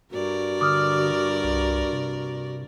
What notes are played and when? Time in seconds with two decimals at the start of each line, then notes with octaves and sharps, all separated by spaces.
0.12 G2 F#4 A#4 D5
0.61 D3 D6 D#6 F6
1.44 C2
1.92 C3